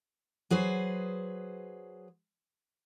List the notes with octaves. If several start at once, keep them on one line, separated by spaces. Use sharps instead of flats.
F#3 G#4 B4 C5